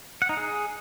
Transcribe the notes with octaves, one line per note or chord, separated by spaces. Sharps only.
F#5
D#4
G#4